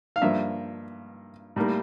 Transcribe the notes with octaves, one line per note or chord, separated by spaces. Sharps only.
F5
G2 F3 A#3 E5
A2 G3 A#3